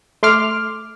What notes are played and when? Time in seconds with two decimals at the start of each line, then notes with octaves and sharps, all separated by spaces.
0.23 A3 C6 D6 F6